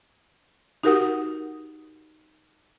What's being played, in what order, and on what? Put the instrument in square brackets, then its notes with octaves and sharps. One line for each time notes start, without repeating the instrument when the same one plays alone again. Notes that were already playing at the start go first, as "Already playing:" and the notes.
[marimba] D#4 F#4 G4 A#4 F#5 D#6